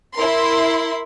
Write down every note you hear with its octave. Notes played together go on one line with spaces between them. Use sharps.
E4 A#4 C6